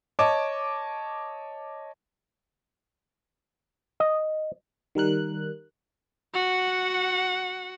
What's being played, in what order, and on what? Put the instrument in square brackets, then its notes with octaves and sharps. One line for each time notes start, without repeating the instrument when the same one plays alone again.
[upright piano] C#5 D#5 A5 D6
[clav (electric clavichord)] D#5
[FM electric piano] D#3 G3 A#4 F#6
[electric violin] F#4 F#5